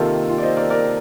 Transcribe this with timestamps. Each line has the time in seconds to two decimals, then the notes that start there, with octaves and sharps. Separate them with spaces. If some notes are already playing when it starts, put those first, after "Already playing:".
Already playing: C3 D#3 A#3 F4 A4
0.29 F4
0.38 D5
0.43 C5 D#5
0.57 A#4 D5
0.70 A#4 D5